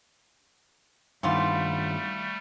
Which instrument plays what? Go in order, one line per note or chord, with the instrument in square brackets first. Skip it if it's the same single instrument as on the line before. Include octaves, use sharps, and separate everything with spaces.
[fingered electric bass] G2 D#3 [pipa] E3 B3 F4 [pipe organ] G3 A3